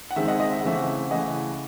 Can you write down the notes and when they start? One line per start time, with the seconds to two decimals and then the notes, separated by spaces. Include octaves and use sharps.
0.11 F#5
0.16 D#3 G#3 C4 E5
0.28 D#5 F#5
0.40 D#5
0.51 E5
0.59 F#5
0.63 C#3 E3 A3 C4 E5
0.75 F#5
0.83 E5
1.11 C#3 E3 A3 D#5 F#5